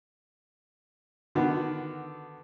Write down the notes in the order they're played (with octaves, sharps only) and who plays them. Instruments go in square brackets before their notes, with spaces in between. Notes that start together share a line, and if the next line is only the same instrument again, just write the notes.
[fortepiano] D3 D#3 B3 F#4